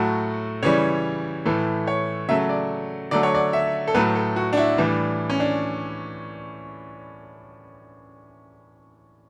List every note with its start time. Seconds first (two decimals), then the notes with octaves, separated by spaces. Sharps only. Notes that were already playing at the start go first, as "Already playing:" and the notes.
Already playing: A2 F#3 A3 F#4
0.63 C#3 E3 G3 C#5
1.45 A2 E3 A3
1.87 C#5
2.29 C#3 F#3 A3 E5
2.49 D5
3.11 D3 F#3 A3 D5
3.23 C#5
3.35 D5
3.53 E5
3.88 A4
3.95 A2 F#3 A3 B4
4.15 A4
4.36 F#4
4.53 D4
4.57 E4
4.77 A2 E3 G3 D4
5.30 C#4
5.40 D4